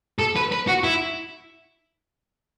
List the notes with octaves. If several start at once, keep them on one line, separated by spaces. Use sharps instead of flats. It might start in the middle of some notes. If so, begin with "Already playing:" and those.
A4
B4
B4
F#4
E4